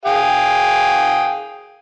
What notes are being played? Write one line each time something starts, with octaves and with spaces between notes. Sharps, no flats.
G#4 F5 G5